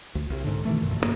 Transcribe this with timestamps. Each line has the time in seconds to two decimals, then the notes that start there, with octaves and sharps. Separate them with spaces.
0.15 D2
0.30 C2
0.44 G#2 D3
0.65 B2 D#3 E3 A3
0.82 A#1 F#2
1.00 G1 C#3 A#3